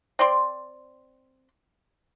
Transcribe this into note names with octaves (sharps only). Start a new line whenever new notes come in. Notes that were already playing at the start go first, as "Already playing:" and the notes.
C4 D5 C6